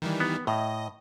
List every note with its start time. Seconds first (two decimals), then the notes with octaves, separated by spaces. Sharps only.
0.02 D#3 E3 G3
0.20 B3
0.47 A2 D#5